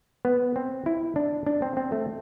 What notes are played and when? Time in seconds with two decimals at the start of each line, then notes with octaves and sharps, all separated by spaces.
0.25 B3
0.56 C4
0.86 E4
1.16 D4
1.46 D4
1.62 C4
1.77 C4
1.92 A3